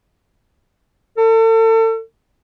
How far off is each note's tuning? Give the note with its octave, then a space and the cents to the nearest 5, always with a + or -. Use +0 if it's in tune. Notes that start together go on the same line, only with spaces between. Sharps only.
A4 +35